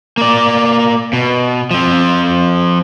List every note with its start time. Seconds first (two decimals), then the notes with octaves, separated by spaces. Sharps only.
0.18 A#3 D5
1.13 B2
1.71 F3 C4